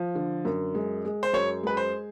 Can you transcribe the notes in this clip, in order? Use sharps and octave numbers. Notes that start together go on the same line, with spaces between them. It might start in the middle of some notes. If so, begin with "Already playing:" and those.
Already playing: F3
D3
F#2
G#3
G#3
C5
F#2 C#5
G#3 B4
C5